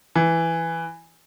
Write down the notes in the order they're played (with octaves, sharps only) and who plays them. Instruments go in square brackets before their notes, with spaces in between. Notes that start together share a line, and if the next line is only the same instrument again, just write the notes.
[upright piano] E3